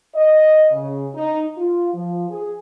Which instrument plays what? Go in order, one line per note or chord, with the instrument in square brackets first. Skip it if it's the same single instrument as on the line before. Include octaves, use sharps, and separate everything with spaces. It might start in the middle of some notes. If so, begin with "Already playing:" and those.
[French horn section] D#5
C#3
D#4
F4
F3
G#4